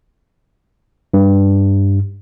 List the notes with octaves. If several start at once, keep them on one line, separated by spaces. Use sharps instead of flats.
G2